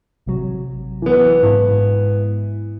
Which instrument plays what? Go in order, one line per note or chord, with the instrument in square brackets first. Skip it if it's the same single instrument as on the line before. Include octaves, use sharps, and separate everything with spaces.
[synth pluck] A1 C3 F#3
[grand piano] E3 B3
[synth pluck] G#2 E4